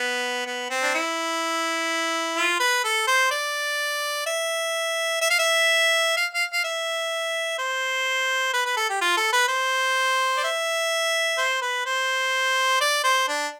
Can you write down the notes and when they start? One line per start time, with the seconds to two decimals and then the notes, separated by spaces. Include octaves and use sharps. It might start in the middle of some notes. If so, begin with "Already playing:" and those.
Already playing: B3
0.47 B3
0.70 C4
0.83 D4
0.95 E4
2.37 F4
2.60 B4
2.84 A4
3.08 C5
3.31 D5
4.27 E5
5.21 E5
5.31 F5
5.39 E5
6.17 F5
6.35 F5
6.53 F5
6.64 E5
7.59 C5
8.54 B4
8.66 B4
8.77 A4
8.90 G4
9.01 F4
9.17 A4
9.33 B4
9.48 C5
10.37 D5
10.44 E5
11.38 C5
11.62 B4
11.86 C5
12.81 D5
13.04 C5
13.28 D4